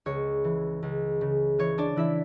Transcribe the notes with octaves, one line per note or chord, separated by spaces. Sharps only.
C#2 C#5
E3
C#2
C#3
E3 C#5
D4 D5
E3 E4 E5